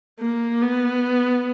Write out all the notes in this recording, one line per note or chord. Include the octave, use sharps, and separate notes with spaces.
A#3
B3